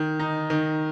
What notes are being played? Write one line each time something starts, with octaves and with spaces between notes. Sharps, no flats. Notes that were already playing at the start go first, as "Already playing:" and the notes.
Already playing: D#3
D#4
D#3